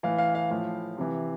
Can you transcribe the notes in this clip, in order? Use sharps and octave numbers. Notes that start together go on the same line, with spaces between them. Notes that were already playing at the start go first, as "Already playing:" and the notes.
A2 E3 F5
F5
F5
A2 F3 F5
C3 E3